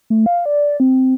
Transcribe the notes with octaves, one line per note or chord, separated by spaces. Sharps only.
A3
F5
D5
C4